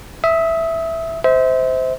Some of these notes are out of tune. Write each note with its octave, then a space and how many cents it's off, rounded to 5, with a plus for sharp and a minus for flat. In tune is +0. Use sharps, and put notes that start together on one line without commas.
E5 +0 D#6 +30
C5 -15 E5 -35